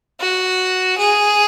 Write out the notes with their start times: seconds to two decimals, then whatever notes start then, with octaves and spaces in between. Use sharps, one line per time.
0.21 F#4
0.98 G#4